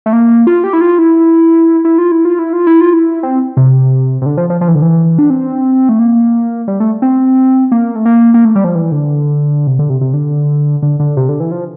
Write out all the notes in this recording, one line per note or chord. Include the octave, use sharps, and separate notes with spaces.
A3
A#3
F4
G4
E4
F4
E4
E4
F4
E4
F4
E4
F4
E4
F4
E4
C4
C3
C3
D3
F3
F3
F3
E3
D3
E3
D4
C4
A3
A#3
G3
A3
C4
A#3
A3
A#3
A#3
A3
G3
F3
E3
D3
C3
D3
C3
C3
D3
D3
D3
C3
D3
E3
F3